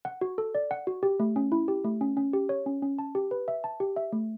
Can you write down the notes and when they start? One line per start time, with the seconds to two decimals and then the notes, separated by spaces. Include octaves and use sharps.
0.05 F#5
0.21 F#4
0.38 A4
0.55 D5
0.71 F#5
0.87 F#4
1.03 G4
1.20 A3
1.36 C#4
1.52 E4
1.68 G4
1.84 A3
2.01 C#4
2.17 C#4
2.33 G4
2.49 C#5
2.66 C#4
2.82 C#4
2.99 A5
3.15 G4
3.31 B4
3.48 E5
3.64 A5
3.80 G4
3.96 E5
4.13 A3